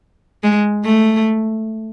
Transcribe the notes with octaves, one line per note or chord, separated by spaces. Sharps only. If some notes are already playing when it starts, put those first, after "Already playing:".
G#3
A3